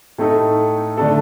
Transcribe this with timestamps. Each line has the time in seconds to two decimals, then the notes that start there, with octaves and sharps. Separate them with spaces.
0.18 A2 A3 D#4 A4
0.97 D3 A3 D4 A4